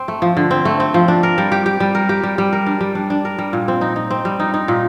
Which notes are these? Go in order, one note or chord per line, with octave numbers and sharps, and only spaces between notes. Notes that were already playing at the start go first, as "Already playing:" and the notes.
Already playing: C4
A3
F3
D3
C4
A3
C4
F3
D4
A#4
G3
G4
G4
G3
A#4
G4
G3
G3
A#4
D4
G3
D4
D4
A#4
G3
A#2
C4
D#4
D#4
C4
G3
D#4
D#4
A#2